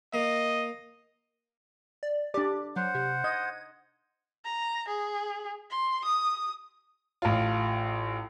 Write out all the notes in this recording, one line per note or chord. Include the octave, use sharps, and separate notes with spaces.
A#3 D#5
D5
D4 G4 D5
F#3 C5 F#5
C3
D#5 G#6
A#5
G#4
C6
D#6
A1 F4